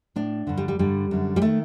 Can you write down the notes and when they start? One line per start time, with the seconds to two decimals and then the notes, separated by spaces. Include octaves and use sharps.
0.16 A2 D4
0.47 G2 D3
0.57 G3
0.68 G3
0.79 G2 D3 G3
1.11 F#2 D3
1.36 G3
1.42 D#3 A3